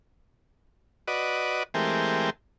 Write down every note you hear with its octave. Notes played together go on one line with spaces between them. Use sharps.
F#4 B4 D5 D#5
E3 G#3 A3 C4 G4 A#4